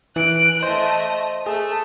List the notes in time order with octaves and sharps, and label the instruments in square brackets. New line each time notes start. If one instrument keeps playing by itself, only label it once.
[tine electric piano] E3 [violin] F#6 D7
[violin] A3 D#5 [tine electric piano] C5
[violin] A3 A4 [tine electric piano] G#4